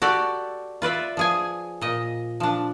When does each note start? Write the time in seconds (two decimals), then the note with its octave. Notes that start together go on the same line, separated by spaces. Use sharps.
0.02 F#4 G4 A4 D5
0.82 F4 B4 D5 E5
1.17 F3 G#4 G#5
1.81 A#2 D#5
2.40 F3 D4